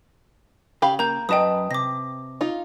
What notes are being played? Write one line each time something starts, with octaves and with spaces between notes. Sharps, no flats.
C#3 G4 F5 B5
A#3 A#5 G6
F#2 F#4 B4 D#5 G5 A5 D#6
C3 D6 A#6
D#4 F4